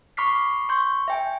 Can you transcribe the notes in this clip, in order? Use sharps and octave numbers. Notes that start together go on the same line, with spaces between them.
B5 C#6 D6 F6 B6 C7
C6 C#6 G6
E5 G5 G#5